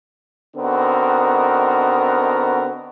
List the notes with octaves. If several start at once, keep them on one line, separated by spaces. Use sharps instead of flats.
D3 B3 C4 D#4 F#4 A#4